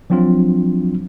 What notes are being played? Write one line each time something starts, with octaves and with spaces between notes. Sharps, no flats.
F3 F#3 C4 D4 F4